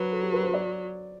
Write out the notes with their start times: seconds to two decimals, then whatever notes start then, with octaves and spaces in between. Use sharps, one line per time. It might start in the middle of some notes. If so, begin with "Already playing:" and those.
Already playing: F#3 B4 C5
0.12 A4
0.23 G4
0.33 B4
0.43 C5
0.54 D5